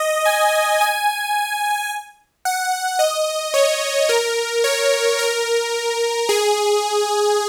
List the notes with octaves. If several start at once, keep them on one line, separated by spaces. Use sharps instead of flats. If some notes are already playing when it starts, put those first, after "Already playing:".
Already playing: D#5
G#5
G#5
F#5
D#5
C#5
A#4
C#5
A#4
G#4